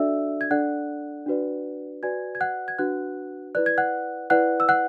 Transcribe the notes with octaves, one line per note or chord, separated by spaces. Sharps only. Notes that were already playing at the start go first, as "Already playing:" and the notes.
Already playing: D4 F#4 A4 D5 E5 E6
G#6
D4 A4 D5 F#5 F#6
D4 F#4 B4 D5
F#4 B4 D5 G#5 G#6
G#6
F#5 F#6
G#6
D4 F#4 B4 F#5 F#6
E4 B4 D5 F#6
G#6
F#5 F#6
E4 B4 D5 F#5 F#6
E6
F#5 F#6